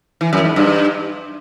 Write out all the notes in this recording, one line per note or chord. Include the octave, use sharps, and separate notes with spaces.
E3
F#2
G#2
G2